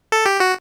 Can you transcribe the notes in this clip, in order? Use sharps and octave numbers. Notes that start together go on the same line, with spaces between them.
A4
G4
F#4